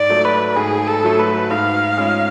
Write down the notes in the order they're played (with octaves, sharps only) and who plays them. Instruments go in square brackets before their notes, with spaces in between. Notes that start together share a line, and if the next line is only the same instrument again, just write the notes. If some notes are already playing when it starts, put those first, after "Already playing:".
Already playing: [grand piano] G#2 [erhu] D5
[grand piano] F#3 A3
[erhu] B4
[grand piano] G#2 [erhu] G#4
[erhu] A4
[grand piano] F#3 A3
[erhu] B4
[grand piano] G#2 [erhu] F5
[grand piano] G#3 C#4 F4